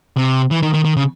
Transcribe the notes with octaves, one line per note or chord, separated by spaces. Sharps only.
C3
E3
D#3
D#3
D#3
C#3